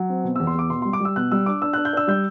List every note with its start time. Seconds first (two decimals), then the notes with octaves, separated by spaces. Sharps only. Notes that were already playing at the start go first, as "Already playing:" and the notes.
Already playing: F#3
0.09 C4
0.24 B2
0.36 E2 E6
0.47 C6
0.54 E2 D6
0.70 B2 C6
0.82 G3 C6
0.93 D6
1.00 G3 E6
1.16 B2 F#6
1.31 G3 E6
1.46 D4 D6
1.62 D4 E6
1.73 D4 F#6
1.85 G6
1.93 D4 E6
2.08 G3 G6